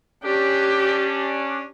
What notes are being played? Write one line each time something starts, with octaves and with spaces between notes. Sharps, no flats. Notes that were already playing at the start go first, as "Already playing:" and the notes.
C#4 D4 G4